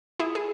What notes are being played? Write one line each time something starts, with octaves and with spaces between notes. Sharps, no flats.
E4 G#4
G#4